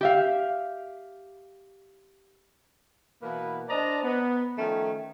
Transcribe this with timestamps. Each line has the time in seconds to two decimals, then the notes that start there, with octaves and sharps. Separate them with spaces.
0.01 G4 E5 F5
3.22 B2 E3 A#3 B3 E4 B4
3.69 D4 C5 D5 D#5 A5 A#5
4.03 B3
4.58 D#3 F3 A3 C#4